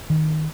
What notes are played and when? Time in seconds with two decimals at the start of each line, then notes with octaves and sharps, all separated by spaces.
0.10 D#3